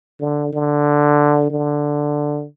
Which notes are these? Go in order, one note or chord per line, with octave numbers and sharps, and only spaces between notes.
D3
D3
D3